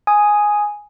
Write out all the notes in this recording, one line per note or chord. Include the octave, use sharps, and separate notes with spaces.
G#5 D#6